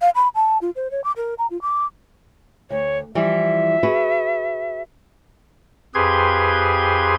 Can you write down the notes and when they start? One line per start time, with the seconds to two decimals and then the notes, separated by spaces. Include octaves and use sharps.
0.01 F5
0.15 B5
0.35 A5
0.62 F4
0.76 C5
0.91 C#5
1.04 D6
1.17 A#4
1.38 A#5
1.51 F4
1.62 D6
2.70 D2 C#5
3.15 E3 F3 G3 E5
3.83 F#4 G#4 B4
5.95 F2 G4 G#4 B4 C6 G#6